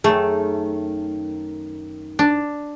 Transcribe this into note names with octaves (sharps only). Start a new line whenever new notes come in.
F#2 D#3 A3 G#4
D4